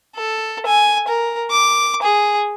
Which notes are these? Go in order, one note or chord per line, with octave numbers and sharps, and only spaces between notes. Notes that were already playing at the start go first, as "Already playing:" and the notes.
A4
G#5
A#4
D6
G#4